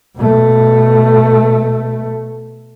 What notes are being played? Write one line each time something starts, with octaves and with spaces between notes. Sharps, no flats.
B2 A3